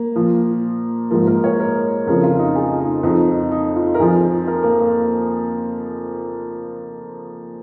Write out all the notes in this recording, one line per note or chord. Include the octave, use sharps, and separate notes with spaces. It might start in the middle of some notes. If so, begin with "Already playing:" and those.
Already playing: A#3
A#2 F3
G#2 F3 A#3
A#4
C#5
A#4
F2 C#3 F3 A#4
F4
D#4
G#4
D#4
F2 F3 D#4
D#4
F4
A#4
F2 F3 G#4
A#4
A#3
A#3